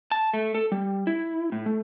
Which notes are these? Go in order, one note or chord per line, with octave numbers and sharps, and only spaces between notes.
A5
A3
A4
G3
E4
A2
A3